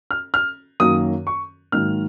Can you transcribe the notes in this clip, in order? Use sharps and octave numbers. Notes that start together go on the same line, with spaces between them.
F6
F6
F#2 D#3 F#3 A#3 D#6
C#6
G#2 D#3 F#3 A#3 F6